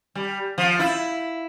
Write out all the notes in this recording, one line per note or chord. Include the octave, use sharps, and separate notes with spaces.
G3
F3
E4